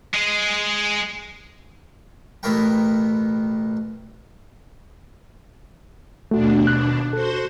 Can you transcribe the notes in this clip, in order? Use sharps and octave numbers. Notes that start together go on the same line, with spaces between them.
G#3 G#4
A1 B2 A3 B3 A#4 G5
D#2 B2 A3 D4 F#4
F#6
F#4 A4 C5 C6